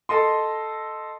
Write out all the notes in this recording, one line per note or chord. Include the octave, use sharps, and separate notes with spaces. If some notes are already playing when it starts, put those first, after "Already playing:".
A4 D#5 C6